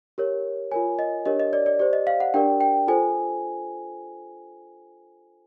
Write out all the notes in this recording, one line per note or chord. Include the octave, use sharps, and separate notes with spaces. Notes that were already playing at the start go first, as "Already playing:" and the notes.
G4 A#4 C#5
F4 A#4 C#5 G#5
D#5
D4 G4 A#4 C#5 D#5
D#5
D5
D5
G4 C5 D5
D#5
F5
F#5
D4 G4 A#4 D5 G5
G5
F4 A4 C5 G#5